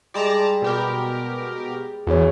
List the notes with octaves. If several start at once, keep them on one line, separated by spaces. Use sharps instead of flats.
G3 G#3 D5 A5 A#5
B2 G4 A#4
E2 F#4 G#4 C#5